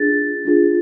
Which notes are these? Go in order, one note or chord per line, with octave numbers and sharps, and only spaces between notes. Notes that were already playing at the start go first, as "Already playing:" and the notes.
Already playing: D4 F4 G#4 A6
D4 F4 G#4